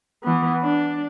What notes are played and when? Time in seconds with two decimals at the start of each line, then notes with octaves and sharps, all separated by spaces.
0.23 E3 B3
0.62 D4